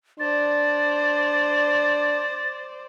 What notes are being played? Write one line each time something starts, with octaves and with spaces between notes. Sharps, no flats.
D4 C5 D5 A6